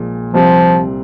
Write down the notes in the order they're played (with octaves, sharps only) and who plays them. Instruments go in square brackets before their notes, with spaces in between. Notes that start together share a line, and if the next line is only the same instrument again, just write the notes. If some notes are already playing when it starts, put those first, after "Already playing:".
Already playing: [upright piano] A#1 A#2 F3 G#3
[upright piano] C2 C3 G3 C4 F4 [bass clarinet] F3